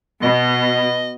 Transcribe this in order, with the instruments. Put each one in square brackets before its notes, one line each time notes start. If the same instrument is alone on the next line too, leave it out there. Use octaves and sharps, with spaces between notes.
[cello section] B2 [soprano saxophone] D#5